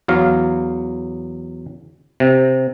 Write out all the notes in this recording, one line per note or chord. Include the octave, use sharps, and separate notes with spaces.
E2 F#3 F5
C3